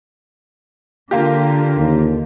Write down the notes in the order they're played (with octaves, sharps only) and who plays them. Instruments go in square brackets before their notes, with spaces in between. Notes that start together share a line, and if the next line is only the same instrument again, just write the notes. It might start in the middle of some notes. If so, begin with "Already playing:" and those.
[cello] D3 [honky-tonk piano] A#3 F4 G4
[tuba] D#2